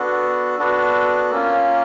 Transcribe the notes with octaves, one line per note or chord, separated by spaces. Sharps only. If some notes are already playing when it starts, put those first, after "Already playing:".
Already playing: B3 D4 F#4 A4
B3 D4 F#4 A4
A#3 C#4 F4